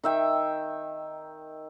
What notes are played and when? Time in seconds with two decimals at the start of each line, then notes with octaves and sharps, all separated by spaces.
0.03 D#3 E5 G5